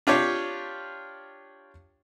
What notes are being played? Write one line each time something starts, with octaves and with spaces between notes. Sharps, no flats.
D4 F4 G4 C#5 F5